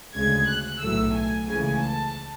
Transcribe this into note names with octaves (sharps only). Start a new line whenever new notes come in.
D2 C#3 G#3 G#6
F#6
B1 A2 F#3 A3 E6
G#5
C#2 C#3 E3 A3 G#5
A5